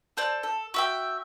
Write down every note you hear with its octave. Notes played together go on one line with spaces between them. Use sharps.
A4 C5 D5
A4
F#4 E5 G5